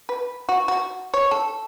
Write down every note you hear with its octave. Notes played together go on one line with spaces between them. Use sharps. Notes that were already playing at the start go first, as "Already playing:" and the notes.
B4
F#4
F#4
C#5
A4